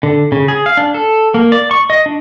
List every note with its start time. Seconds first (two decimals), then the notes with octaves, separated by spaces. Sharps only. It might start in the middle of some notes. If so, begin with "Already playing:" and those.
0.03 D3
0.32 C#3
0.48 G#4
0.66 F5
0.77 D4
0.94 A4
1.34 A#3
1.52 D5
1.71 C#6
1.90 D#5
2.06 D4